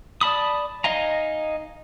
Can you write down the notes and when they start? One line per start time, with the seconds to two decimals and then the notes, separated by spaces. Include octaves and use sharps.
0.21 D5 A5 B5 D#6
0.84 D#4 D#5 F5 G#5 A#5